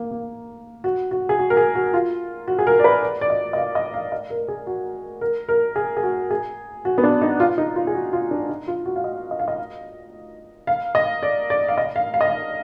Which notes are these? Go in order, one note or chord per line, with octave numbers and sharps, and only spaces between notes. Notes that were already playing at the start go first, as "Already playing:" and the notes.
Already playing: A#3
A#3
F#4
F#4
G#4
F#4
A#4
G#4
F#4
F4
F#4
G#4
A#4
D5
B4
D5
D5
D#5
D#5
F5
D#5
F5
D#5
A#4
G#4
F#4
A#4
A#4
G#4
G#4
F#4
G#4
F#4
B3
D4
D#4
F4
D#4
F4
G#4
F#4
F4
D4
D#4
F4
F#4
F5
D#5
D#5
F5
D#5
F5
D#5
D5
D5
F5
D#5
F5
F5
D#5
F5